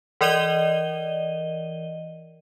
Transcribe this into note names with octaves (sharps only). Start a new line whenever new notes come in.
E3 A#4 D5 D#5 D#7 G7